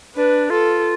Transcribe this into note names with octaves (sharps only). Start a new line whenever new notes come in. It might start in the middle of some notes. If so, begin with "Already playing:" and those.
D4 B4
F4 A4